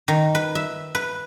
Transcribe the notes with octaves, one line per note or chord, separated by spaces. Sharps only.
D#3
B4
E5
B4